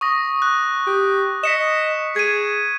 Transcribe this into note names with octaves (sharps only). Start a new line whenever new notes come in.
C#6 D#6 A#6
F#6
G4
D#5 B6 C#7 E7
G#4 G#6 D#7